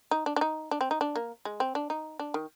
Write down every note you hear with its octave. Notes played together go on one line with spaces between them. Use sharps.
D#4
D4
D4
D#4
D4
C4
D#4
D4
A#3
G#3
C4
D4
D#4
D4
D#3